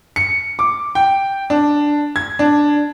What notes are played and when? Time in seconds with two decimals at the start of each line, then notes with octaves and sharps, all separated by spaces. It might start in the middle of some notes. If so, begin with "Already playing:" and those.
0.16 C#7
0.59 D6
0.95 G5
1.50 D4
2.16 G#6
2.39 D4